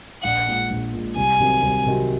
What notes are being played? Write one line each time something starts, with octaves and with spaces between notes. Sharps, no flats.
A#1 F#5
A#2 G#3
A#1
A#2 G#3
C2 G#5
C3 D#3 F#3 C4
C2
C3 D#3 F#3 C4